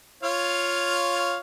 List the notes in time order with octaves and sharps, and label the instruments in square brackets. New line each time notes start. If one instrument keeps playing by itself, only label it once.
[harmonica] F4 C#5 F5